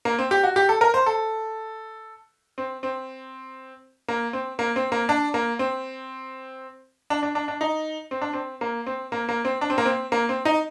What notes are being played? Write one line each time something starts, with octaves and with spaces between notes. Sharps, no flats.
A#3
C4
G4
F#4
G4
A4
A#4
C5
A4
C4
C4
A#3
C4
A#3
C4
A#3
D4
A#3
C4
D4
D4
D4
D4
D#4
C4
D4
C4
A#3
C4
A#3
A#3
C4
D4
C4
A#3
C4
A#3
C4
D#4